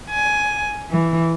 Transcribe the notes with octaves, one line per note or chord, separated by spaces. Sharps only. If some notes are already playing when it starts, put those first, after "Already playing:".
G#5
E3